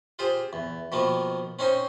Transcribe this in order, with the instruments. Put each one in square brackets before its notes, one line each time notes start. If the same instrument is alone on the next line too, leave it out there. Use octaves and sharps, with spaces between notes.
[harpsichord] F4 G4 G#4 C5
E2
B2 D#3 F3 A#3
C4 C#4 D#4 C5 G#5